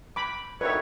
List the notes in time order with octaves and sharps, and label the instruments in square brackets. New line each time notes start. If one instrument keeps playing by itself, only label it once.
[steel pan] B5 D6
[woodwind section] D2 D#3 C#5 [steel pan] B4 E5